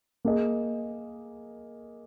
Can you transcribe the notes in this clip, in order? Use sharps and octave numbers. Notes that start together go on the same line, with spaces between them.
A#3 G#4 D#5